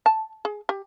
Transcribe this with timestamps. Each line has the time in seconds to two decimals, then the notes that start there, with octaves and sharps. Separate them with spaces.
0.06 A5
0.45 G#4
0.69 G4